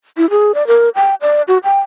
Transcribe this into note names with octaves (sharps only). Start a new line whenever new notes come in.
E4
G#4
D5
A#4
G5
D5
F#4
G5